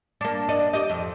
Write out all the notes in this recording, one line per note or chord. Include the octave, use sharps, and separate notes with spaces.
A#3 D4
D5 D#5
G4 D#5
F2